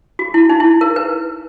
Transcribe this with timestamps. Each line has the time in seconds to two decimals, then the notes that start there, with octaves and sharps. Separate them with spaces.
0.19 F#4
0.34 E4
0.49 D#4
0.60 E4
0.81 A#4
0.96 B4